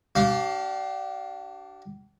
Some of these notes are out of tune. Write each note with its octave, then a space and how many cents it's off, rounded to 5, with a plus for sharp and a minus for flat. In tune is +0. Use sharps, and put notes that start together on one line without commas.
D4 +0 G4 -45 F5 +5